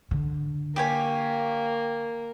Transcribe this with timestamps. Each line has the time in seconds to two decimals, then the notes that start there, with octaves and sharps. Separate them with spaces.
0.11 D3
0.76 A#3 G4 C#5 G#5